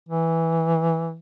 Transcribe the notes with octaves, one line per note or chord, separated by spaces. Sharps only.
E3